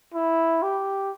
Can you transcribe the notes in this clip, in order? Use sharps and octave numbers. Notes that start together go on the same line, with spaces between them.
E4
G4